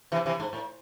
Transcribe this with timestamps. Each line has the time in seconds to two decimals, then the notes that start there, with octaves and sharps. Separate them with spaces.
0.12 C3 E3
0.26 C3 E3
0.40 G#2
0.53 A2